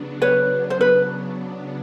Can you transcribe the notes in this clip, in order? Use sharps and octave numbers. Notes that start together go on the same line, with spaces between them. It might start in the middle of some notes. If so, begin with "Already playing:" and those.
Already playing: C#3 F#3 B3 D4
B4 C#5
C5
B4